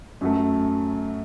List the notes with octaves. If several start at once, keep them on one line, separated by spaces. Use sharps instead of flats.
F#2 F#3 A3